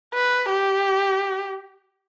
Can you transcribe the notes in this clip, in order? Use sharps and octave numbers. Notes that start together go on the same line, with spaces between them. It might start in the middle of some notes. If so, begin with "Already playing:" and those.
B4
G4